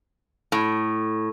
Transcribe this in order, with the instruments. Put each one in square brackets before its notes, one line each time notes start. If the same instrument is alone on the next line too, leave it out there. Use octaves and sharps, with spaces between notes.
[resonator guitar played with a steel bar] A2